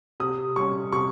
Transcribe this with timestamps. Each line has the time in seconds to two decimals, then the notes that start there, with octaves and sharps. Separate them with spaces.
0.20 C3 D#6
0.56 G3 C#4 C#6
0.92 C3 C#6